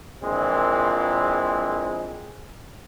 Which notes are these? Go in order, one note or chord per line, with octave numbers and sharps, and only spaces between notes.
A#1 A#2 E3 G#3 C4